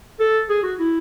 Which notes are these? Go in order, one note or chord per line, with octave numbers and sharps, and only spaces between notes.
A4
G#4
F#4
E4